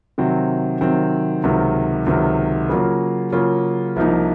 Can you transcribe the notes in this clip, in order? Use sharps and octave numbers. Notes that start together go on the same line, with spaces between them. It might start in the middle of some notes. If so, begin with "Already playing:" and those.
C3 D#3 F#3 C4
C3 D#3 F#3 C4
C#2 C3 D#3 F#3
C#2 C3 D#3 F#3
C#3 F#3 A#3 C#4 F4
C#3 F#3 A#3 C#4 F4
C2 C3 F3 A#3 D#4